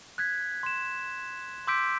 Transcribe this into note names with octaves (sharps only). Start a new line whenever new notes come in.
F#6 G#6 B6
C6 E7
C6 D6 E6 G6 B6 D7